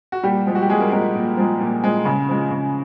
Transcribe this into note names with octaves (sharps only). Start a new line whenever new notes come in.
F#4
A#2 G3 G4
F3 G#3
F#4
G4
A#2 G#3 G#4
A#3 A#4
F3 G#3 A#3 A#4
A#2
F3 G#3
A#2
F3 G#3
C#3
F3 G#3
C#3